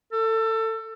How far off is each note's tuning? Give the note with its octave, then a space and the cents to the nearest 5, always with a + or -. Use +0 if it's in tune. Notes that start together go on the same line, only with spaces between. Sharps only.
A4 +25